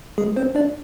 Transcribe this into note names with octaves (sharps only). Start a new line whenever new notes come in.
G#3 G#4
C4 C5
D4 D5